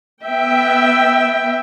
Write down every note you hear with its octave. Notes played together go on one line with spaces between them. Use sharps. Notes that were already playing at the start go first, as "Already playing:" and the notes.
B3 E5 G5